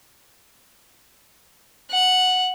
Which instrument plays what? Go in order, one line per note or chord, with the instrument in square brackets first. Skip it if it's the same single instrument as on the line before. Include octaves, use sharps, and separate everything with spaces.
[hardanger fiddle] F#5